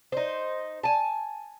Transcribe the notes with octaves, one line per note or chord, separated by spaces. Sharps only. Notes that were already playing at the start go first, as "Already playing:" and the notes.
D#4 C5
G#5 A5